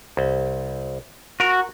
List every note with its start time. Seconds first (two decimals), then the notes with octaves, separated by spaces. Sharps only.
0.17 C2
1.40 F#4 A#4